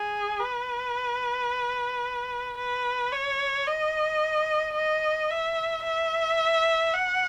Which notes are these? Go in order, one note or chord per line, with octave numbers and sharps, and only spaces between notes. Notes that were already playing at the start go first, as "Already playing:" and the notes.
Already playing: G#4
B4
B4
C#5
D#5
D#5
E5
E5
F#5